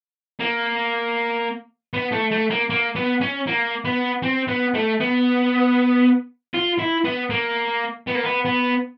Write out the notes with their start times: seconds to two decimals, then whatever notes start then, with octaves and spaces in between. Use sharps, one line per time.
0.40 A#3
1.94 B3
2.12 A3
2.32 A3
2.51 A#3
2.70 A#3
2.95 B3
3.21 C#4
3.47 A#3
3.85 B3
4.23 C4
4.49 B3
4.75 A3
5.00 B3
6.54 F4
6.79 E4
7.05 B3
7.30 A#3
8.07 B3
8.15 A#3
8.23 B3
8.45 B3